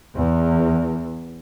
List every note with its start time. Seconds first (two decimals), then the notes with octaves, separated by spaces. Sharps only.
0.15 E2